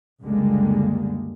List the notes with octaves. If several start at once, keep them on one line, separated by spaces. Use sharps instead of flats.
C#2 F#2 D3 G3 G#3 A#3